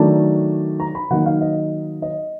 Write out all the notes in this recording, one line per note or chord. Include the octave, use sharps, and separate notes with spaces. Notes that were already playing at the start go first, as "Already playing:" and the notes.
Already playing: D#3 F#3 A3 D4 A5
A#5
B5
D#3 F#3 A#3 D#4 F#5
F5
D#5
D#5